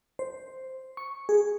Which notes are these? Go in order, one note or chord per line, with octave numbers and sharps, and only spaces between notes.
C5
C#6
G#4